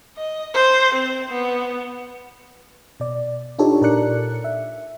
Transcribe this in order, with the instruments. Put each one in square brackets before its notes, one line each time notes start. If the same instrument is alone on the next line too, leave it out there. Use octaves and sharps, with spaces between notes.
[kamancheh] D#5
C5
C4
B3
[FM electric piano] B2 D5
D4 D#4 F4 G4 A4 C#5
A#2 A4 A#4 D5 F#6 C#7
E5